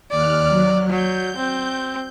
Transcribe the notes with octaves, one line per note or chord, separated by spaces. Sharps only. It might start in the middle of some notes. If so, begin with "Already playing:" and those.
D#2 D5 F6 F#6
F#3
F#3 G6
C4